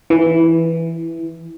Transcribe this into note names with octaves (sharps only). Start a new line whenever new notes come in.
E3